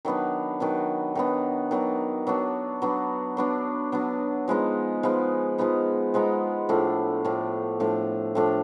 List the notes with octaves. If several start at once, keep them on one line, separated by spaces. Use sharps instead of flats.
D#3 F#3 B3 D4
D#3 F#3 B3 D4
D#3 F#3 B3 D4
D#3 F#3 B3 D4
F#3 B3 D4
F#3 B3 D4
F#3 B3 D4
F#3 B3 D4
F3 G#3 B3 D#4
F3 G#3 B3 D#4
F3 G#3 B3 D#4
F3 G#3 B3 D#4
A2 F3 A3 D4
A2 F3 A3 D4
A2 F3 A3 D4
A2 F3 A3 D4